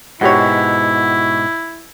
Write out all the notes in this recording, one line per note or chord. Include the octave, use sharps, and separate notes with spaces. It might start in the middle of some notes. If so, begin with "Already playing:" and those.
G#2 B2 E4 F#4 G4 C#5